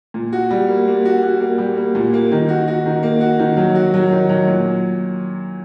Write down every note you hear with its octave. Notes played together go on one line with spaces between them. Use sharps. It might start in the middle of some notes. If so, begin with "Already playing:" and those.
A#2
F#4
G3
A#3
A#3
F#4
F#4
A#3
G3
A#3
A#2
A#3
D#3
F#4
F#4
D#3
A#3
F#4
D#3
F#3
F#4
F#3
D#3
F#3
A#2